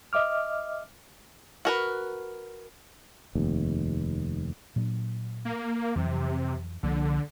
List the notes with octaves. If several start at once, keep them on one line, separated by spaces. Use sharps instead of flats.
D#5 E5 D6 F6
F#4 A#4 B4
F1 D#2
A#2 F#3 D4
A#3
F2 C3 E3 F#3
C2 D3 F3 A#3